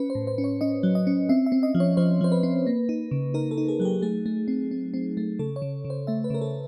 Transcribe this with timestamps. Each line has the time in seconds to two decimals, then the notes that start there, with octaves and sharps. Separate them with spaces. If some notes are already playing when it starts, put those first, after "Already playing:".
Already playing: C#4 B4
0.10 C5
0.15 A2
0.27 C5
0.38 C#4
0.44 C#5
0.61 C#4 D#5
0.83 F#3
0.95 D#5
1.07 C#4
1.29 C4 E5
1.46 E5
1.52 C4
1.63 D#5
1.75 F3
1.80 C#5
1.97 F3 C5
2.21 F3 C5
2.32 B4
2.43 C4
2.67 A#3
2.89 D#4
3.11 C#3
3.34 D#4 A#4
3.51 A4
3.58 D#4
3.68 G#4
3.80 F#3 G#4
3.85 G4
4.02 A3 G#4
4.26 A3
4.48 C4
4.71 C4
4.94 C4
5.17 A3
5.39 C#3 A4
5.56 C#5
5.62 C#3
5.85 C#3
5.90 C5
6.07 A3 E5
6.24 B4
6.30 C#3 A#4
6.41 A4